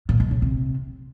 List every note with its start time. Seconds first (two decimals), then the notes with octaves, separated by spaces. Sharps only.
0.09 A#2
0.20 B2
0.31 C#3
0.42 C3